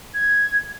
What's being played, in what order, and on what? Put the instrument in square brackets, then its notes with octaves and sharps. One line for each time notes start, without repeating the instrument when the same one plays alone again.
[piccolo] G#6